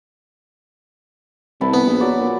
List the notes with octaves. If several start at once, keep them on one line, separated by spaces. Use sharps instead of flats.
C2 E4 B4 A5
B3
A#1
F#3 D5
A#2